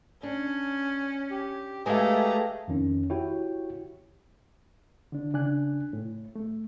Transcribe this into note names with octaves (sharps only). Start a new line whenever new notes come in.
C#4 D4
G4
G#3 A3 G4 G#4 B4 F5 G#5 A#5
F2 D#3 C#4
E4 F#4 G4 C#5 G5
D3 D4
C#3 D4 G#5 F#6
A2
A3